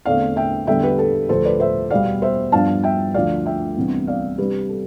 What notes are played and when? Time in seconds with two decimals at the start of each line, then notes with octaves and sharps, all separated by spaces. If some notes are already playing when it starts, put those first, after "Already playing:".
0.05 E2 D3 A3 C4 D5 F5
0.36 E5 G5
0.67 E2 D3 G3 E5 G5
0.83 G4 B4
0.99 A4
1.29 D2 D3 F3 A4 C5
1.45 B4 D5
1.60 C5 E5
1.90 E2 B2 G3 B3 D5 F5
2.22 C5 E5
2.52 G2 F3 B3 D4 F5 A5
2.83 E5 G5
3.14 D2 D3 F3 A3 D5 F5
3.46 E5 G5
3.77 C2 C3 E3 B3 D4
4.07 D5 F5
4.38 C3 G3 D4 G4 B4
4.69 A4